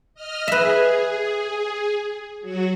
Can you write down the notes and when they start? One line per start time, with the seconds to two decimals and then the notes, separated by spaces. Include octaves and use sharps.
0.14 D#5 F6
0.48 G#4 B4 E5
2.41 F#3 F#4